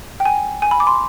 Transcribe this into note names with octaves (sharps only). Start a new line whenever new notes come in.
G5
G#5
G#5
B5
D6
C6